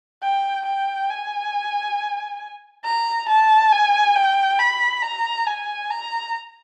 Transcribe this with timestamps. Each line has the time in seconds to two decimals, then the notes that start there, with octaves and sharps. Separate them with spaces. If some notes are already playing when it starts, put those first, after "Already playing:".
0.23 G5
0.66 G5
1.10 G#5
2.85 A#5
3.29 A5
3.73 G#5
4.16 G5
4.59 B5
5.03 A#5
5.47 G#5
5.90 A#5